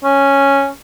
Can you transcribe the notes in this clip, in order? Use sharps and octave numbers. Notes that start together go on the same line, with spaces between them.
C#4